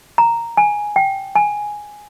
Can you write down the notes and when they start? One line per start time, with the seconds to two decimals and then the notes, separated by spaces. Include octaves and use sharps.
0.18 A#5
0.57 G#5
0.96 G5
1.36 G#5